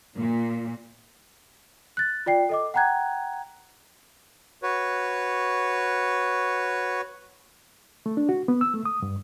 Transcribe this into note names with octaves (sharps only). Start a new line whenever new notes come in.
A#2
F#6 A6
F4 D5 G5 C7
A4 D#5 D6
F#5 G5 A#5 F#6 G#6
F#4 B4 C#5
A3
D4
F#4
B3
E6
A3
D#6
G2